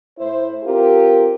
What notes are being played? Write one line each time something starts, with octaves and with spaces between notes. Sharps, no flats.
A2 E4 C5
C4 F4 G4 A#4